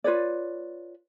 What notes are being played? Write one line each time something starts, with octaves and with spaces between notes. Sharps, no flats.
F4 B4 C#5 D5